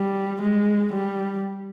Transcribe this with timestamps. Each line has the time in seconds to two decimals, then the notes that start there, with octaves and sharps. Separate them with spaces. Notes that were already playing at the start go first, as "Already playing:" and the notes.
Already playing: G3
0.41 G#3
0.93 G3